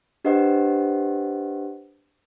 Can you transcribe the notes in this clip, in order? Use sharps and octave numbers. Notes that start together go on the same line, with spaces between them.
D4 G4 B4 C5 D#5 F#5